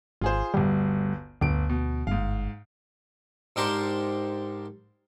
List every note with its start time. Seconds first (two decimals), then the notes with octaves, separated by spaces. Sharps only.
0.21 G#1 F4 G#4 C5
0.54 G1 D2 G3
1.41 G1 D2 D7
1.69 B2
2.07 G1 G#2 F5
3.56 G#2 D4 G4 A#4 A5 C6